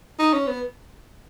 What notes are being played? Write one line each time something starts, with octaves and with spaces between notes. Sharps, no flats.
D#4
C#4
B3